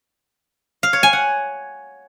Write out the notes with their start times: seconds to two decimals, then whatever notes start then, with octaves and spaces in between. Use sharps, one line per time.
0.83 F5
0.93 C#5
1.03 G#5
1.13 F#5